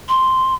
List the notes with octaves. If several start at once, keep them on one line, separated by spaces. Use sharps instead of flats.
C6